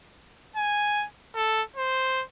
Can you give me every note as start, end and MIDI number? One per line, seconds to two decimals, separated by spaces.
0.56 1.05 80
1.35 1.62 69
1.76 2.24 72